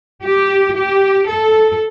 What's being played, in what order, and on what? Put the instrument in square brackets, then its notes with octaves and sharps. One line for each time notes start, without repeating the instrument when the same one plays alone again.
[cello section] G4
G4
A4